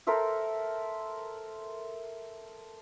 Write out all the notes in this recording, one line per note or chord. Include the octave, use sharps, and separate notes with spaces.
A4 A#4 C5 E5